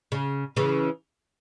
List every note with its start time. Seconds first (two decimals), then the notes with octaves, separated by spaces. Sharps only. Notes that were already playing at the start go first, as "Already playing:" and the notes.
0.12 C#3
0.57 C#3 E3